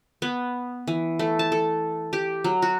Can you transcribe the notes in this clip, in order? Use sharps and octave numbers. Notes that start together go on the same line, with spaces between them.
B3
E3
A3
A5
A4
G4
F#3
F#4